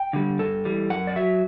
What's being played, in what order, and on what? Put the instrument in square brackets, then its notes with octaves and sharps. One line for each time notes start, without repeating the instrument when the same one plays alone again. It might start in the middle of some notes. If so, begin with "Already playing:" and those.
Already playing: [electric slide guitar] G5
D3 G3
G2 A4
E3 G3
F#2 F#5
D5
F#3 E5